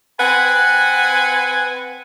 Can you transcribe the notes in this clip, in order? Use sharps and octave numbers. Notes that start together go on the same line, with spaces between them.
C4 B4 F#5 G#5